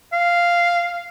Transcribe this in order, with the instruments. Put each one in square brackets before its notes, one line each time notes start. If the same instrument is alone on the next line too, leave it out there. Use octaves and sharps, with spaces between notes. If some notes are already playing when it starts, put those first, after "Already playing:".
[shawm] F5